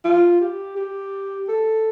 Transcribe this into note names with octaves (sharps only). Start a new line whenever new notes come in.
F4
G4
G4
A4